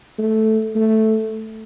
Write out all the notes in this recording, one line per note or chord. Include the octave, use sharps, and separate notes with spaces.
A3
A3